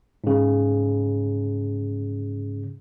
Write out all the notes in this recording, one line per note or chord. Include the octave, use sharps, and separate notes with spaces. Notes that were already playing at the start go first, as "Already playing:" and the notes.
G#2 C#3